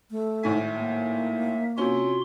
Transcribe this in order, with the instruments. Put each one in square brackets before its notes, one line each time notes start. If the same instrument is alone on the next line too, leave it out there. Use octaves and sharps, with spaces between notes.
[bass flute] A3
[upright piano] G#1 A2 G#5 [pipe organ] E5
[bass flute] A#3
[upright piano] C3 C#4 [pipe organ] F4 F#4 C6